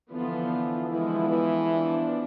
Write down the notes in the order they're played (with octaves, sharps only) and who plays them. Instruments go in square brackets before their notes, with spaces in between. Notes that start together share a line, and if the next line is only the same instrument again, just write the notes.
[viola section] D3 F3 B3 F4 [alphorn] E3
[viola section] D3 F3 G#3 B3 E4 [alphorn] E3
[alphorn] E3
[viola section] F3 B3 D4